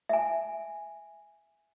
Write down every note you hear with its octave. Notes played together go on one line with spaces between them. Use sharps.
E5 G#5